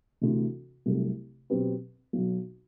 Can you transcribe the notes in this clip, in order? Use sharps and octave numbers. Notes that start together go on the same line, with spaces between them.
D2 C3 E3
C2 C3 F#3 A3
B2 F#3 C4 G4 B4
B1 B2 F#3